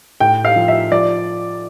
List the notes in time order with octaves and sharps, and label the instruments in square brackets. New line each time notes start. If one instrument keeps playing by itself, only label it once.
[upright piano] A2 G5
F5
F3
E5
F3 D5